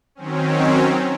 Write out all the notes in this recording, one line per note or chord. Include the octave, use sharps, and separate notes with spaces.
D#3 F#3 C4 C#4